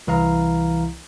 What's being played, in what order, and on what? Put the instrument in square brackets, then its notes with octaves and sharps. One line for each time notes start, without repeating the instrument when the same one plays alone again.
[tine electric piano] C2 E3 E4 F5 A#5